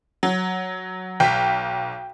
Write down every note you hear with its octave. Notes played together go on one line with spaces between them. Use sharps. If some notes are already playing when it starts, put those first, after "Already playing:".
F#3
B1 G5 B6